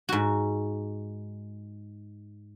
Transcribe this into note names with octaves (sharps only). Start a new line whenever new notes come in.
G#2 F#4